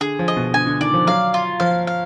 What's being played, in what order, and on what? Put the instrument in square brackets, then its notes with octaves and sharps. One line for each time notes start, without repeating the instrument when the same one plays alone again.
[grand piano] D3 [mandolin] G#4
[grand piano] F3
[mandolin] D#5
[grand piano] B2
[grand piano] D3 [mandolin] G#5
[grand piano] D3
[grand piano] D#3 [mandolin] D5
[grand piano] F3
[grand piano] F#3 [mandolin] F5
[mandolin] F4
[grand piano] F3 [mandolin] F5
[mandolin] F5